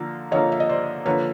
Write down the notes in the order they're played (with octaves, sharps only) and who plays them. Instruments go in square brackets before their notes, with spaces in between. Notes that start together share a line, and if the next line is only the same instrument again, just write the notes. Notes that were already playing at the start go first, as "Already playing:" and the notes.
Already playing: [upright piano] D3 F3 A#3
[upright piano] D3 F3 A#3 [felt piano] C#5 D#5
[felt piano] E5
D#5
C5 D5
[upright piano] D3 F3 A#3 [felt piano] B4 C#5